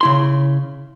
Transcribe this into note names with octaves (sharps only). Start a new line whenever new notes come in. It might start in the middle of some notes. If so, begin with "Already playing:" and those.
C#3 E4 C6